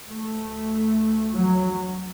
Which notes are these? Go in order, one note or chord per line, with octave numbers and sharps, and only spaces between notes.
D2 A3
F#3